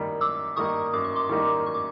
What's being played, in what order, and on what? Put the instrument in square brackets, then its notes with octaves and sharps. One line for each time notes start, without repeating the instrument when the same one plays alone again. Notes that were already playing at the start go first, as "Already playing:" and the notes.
Already playing: [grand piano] F#2 D#3 G3 A#3 D#4
[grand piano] F#2 [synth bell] D6 E6
[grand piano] D#3 G3 A#3 D#4 [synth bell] C#6 D#6
[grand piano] F#2 [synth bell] D6
[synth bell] C#6
C6 D6
[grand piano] D#3 G3 A#3 D#4
[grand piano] F#2 [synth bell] C#6
[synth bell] D6